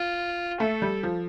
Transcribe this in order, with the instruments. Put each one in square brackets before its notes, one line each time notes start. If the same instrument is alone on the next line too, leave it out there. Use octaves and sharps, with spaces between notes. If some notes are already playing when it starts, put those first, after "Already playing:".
Already playing: [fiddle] F4
[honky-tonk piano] A3 [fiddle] A4
[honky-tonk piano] G3
F3